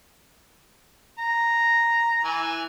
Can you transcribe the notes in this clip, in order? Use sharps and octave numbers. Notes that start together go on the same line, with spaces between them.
A#5
E3 G#5